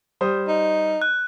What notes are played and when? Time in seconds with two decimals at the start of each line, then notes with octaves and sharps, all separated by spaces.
0.21 G3 C5 D#6
0.48 D#4
1.02 F#6